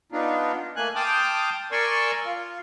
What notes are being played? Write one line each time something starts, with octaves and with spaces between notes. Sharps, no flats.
B3 D4 D#4 F4
A3 A#3 G#5 F#6
G5 A5 C6 D6 D#6 F6
A#4 D5 G#5 C6 C#6 E6
F4